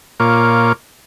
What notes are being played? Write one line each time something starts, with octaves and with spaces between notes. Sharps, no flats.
A#2 A#3 F4 C#5 D6